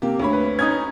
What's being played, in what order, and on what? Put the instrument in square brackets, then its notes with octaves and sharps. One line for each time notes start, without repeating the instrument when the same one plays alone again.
[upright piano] C3 A#3 G4
D2 C#5 B5
[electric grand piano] B4
[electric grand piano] C#4 D#4 [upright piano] D#6 G#6